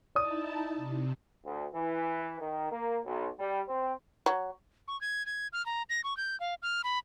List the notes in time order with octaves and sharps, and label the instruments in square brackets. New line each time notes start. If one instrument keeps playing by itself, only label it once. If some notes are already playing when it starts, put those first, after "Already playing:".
[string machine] D#4 E4 A5 [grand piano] D5 D#6
[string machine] C3
[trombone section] D2
E3
D#3
A#3
B1
G3
C4
[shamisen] F#3
[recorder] C#6
G#6
G#6
F6
A#5
A#6
C#6
G6
F5
F6
B5